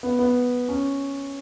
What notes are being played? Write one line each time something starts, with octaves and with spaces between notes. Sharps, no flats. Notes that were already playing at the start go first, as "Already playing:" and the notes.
B3
B3
C#4